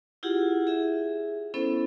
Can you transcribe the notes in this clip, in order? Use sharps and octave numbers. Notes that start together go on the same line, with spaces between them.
E4 F4 G4 G#4 F#5
G#4 E5
B3 C#4 E4 A4 C5